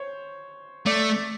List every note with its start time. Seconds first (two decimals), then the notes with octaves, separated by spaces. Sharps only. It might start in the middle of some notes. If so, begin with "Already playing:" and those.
Already playing: C5 C#5
0.86 A3 D5